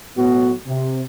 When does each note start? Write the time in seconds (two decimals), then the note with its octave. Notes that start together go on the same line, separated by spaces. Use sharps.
0.17 A2 F#3 B3 F#4
0.68 C3